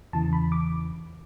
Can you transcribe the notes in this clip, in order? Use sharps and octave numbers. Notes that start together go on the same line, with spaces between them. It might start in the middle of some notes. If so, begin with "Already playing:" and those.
E2 C#3 E3 A5
B5
D6